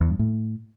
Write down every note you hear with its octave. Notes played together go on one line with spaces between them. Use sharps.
E2
G2
A2